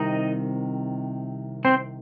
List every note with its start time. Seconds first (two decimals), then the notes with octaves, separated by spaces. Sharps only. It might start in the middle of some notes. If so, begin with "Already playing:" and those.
Already playing: C2 C3 D#3 D#4 D#5
1.65 C4 C5